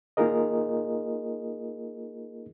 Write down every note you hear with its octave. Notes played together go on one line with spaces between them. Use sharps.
A#3 D#4 F4 G#4 A#4 D#5